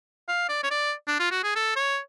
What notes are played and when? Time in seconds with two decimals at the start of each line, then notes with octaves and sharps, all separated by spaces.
0.28 F5
0.49 D5
0.63 C#5
0.71 D5
1.08 D4
1.20 F4
1.31 F#4
1.44 G#4
1.56 A4
1.76 C#5